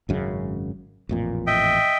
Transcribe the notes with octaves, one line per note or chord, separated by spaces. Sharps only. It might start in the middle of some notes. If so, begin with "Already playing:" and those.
G#1 F#2 C#3
A1 F2 A#2
D#5 E5 G5